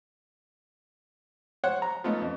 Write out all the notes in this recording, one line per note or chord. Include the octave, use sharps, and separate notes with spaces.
C5 C#5 F#5
A#5
F3 A3 B3 C#4 D#4
F2